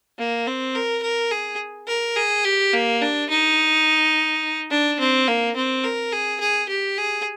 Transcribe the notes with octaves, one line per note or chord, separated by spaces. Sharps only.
A#3
C4
A#4
A#4
G#4
A#4
G#4
G4
A#3
D4
D#4
D4
C4
A#3
C4
A#4
G#4
G#4
G4
G#4